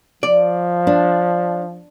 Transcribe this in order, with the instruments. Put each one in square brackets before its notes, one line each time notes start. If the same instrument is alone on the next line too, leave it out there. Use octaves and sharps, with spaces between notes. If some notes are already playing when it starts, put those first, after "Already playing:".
[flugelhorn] F3 [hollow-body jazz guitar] D5
[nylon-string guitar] D4